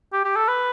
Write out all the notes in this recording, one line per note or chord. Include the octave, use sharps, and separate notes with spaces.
G4
G4
A4
B4